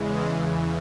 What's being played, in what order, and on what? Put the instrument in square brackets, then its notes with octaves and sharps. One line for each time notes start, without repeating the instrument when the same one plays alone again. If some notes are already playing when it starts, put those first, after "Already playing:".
Already playing: [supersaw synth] E2 C#3 E3 G#3